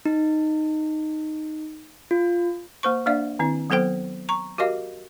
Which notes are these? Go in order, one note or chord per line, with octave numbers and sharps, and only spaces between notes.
D#4
F4
A#3 C5 C#6
A#3 D4 D5 E5 F5
D#3 C4 E4
F#3 B3 A4 C5 G5
A#5 C#6
F#4 G4 A#4 D#5 F5